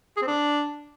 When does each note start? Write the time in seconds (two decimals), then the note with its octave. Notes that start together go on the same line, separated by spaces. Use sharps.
0.17 G#4
0.22 C4
0.27 D4